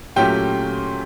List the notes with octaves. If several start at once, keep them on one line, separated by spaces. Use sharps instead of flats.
A#2 F#3 A3 C#4 G4 G5